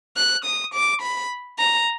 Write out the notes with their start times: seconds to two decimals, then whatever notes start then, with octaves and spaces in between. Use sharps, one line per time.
0.17 F#6
0.45 D#6
0.74 D6
1.02 B5
1.59 A#5